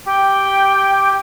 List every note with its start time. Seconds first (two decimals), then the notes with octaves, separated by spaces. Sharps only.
0.06 G4 G5